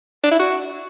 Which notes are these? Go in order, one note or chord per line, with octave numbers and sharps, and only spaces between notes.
D4
E4
F#4